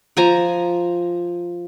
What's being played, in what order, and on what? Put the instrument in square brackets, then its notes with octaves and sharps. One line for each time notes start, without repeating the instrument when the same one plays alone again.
[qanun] F3 G#5 A#5